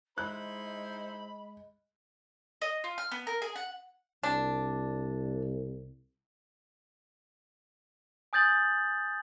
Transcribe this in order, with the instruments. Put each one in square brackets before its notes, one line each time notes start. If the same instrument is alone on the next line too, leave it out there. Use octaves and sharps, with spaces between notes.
[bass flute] G#3 [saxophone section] D#4 E4 C5 [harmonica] B5 [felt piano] F#6
[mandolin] D#5
F4
F6
B3
A#4
G#4
F#5
[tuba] C2 [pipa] D4
[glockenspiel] G#5 D#6 G6 A6 F#7